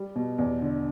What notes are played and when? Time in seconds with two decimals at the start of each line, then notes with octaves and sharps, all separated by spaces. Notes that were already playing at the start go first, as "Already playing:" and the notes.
Already playing: G3
0.15 B2
0.38 E2
0.62 D3